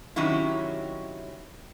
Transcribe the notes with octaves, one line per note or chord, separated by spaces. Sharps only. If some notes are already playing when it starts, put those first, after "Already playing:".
C3 D#3 F#3 C#4 E4